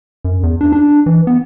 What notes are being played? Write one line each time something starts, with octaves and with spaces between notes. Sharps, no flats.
F#2
E2
D4
D4
E3
B3